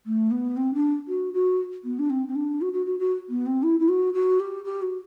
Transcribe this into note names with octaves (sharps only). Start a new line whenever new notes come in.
A3
B3
C4
D4
F#4
F#4
B3
D4
C4
C4
D4
F#4
F#4
F#4
F#4
B3
C4
E4
E4
F#4
F#4
G4
G4
F#4